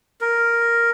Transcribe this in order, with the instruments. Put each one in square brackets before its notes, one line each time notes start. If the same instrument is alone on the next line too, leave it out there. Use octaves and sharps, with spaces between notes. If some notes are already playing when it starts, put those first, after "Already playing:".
[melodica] A#4